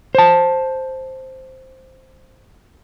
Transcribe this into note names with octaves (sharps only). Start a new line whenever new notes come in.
C5 A5